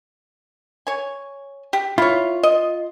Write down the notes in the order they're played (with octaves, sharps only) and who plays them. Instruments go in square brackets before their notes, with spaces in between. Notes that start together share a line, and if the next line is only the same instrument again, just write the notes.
[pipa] C#5 G#5
G4
[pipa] E4 C#5 [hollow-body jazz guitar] F4
[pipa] D#5